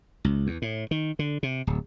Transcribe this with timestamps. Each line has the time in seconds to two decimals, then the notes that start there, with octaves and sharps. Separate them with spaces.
0.25 C#2
0.47 E2
0.62 A2
0.91 D#3
1.19 D3
1.43 C3
1.67 D1